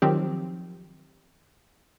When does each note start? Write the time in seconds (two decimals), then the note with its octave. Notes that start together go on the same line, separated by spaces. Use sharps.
0.02 D#3 F3 F#3 C4 G4